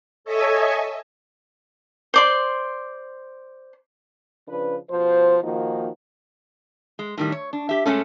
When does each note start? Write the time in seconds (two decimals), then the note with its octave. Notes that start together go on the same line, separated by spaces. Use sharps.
0.25 A4 C#5 D#5 E5 G#5
2.14 C5 D5 C6
4.48 C#3 F3 D4 B4
4.91 B2 F3 C5
5.43 D#3 F3 A#3 D#4 F#4
6.99 G#3
7.17 A2 D#3 G3
7.32 C#5
7.53 D4
7.69 G4 E5
7.86 A#2 G#3 A3 C#4 A4